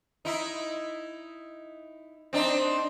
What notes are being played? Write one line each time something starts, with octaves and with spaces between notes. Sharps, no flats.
D#4 E4
C4 D4 D#4